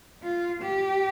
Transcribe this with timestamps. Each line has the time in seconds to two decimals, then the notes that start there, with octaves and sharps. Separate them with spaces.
0.23 F4
0.62 G4